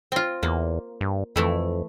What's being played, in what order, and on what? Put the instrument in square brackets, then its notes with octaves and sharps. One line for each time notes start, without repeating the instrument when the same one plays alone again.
[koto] C4 F4
[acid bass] E2 [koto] A#3
[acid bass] G2
[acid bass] F2 [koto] E3 A3 E4